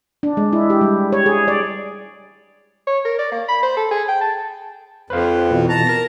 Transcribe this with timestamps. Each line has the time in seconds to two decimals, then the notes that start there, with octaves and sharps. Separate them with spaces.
0.23 D4
0.37 G#3
0.53 E4
0.70 G4
0.81 G3
1.13 C#5
1.26 G#4
1.48 D5
2.87 C#5
3.05 A#4
3.19 D5
3.32 A#3
3.48 B5
3.63 C5
3.77 A4
3.91 G#4
4.08 G5
4.21 A5
5.10 F2 B4 C5 F5
5.51 B2 E3
5.69 A5 A#5
5.87 A#4 A#6